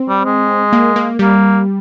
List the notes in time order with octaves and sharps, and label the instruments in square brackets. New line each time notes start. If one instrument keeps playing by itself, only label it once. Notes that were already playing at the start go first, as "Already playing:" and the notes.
Already playing: [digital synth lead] C4
[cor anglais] G3
G#3
[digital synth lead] A#3
A#3
[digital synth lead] G3 [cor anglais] A#3